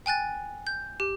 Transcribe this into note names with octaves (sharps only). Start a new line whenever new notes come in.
G5 G#5 F#6 A6
G6
G4